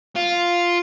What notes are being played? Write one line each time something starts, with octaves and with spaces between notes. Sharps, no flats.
F4